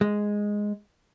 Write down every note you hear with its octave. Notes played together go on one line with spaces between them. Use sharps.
G#3